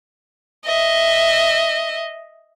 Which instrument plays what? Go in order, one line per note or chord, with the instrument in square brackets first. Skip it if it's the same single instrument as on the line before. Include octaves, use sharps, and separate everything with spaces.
[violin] D#5 E5